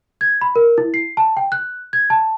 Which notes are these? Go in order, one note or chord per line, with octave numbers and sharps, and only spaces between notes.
G#6
B5
A#4
E4
C7
A5
G5
F#6
G#6
A5